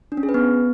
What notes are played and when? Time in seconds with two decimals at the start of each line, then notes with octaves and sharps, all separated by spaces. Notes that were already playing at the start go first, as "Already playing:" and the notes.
0.12 D4
0.17 C#4
0.23 G#4
0.29 B4
0.34 B3